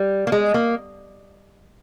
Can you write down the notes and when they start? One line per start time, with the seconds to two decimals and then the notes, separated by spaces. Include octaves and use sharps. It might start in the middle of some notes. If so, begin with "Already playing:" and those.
Already playing: G3
0.27 A#3
0.32 G#3
0.54 A#3